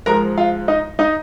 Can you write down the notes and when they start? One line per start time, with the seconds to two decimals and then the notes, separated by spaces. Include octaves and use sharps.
0.06 G#2 F3 G#3 A#4 A#5
0.38 F4 F5
0.68 D#4 D#5
0.99 D#4 D#5